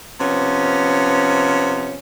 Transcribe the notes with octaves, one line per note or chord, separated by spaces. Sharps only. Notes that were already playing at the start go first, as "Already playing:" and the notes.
C3 F3 B3 C#4